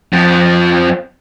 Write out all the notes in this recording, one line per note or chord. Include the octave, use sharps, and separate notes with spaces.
F2 F3